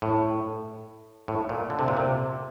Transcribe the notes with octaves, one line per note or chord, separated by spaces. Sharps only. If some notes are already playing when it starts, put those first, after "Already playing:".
A2
A2
A#2
D3
C3
A#2
C3